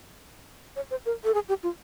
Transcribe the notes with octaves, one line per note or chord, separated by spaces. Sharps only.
C#5
C5
A#4
A4
G#4
G4
F4